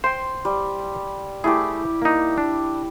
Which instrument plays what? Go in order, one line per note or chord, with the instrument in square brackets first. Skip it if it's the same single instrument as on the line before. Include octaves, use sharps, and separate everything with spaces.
[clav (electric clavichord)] C5 G5 [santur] C6
[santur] G3
[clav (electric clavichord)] A3 G#4 [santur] E4 G4
[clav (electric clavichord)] A#3 D#4
D4